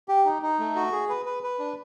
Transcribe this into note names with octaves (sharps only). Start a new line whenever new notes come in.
G4
D#4
D#4
A3
F#4
G#4
B4
B4
B4
D4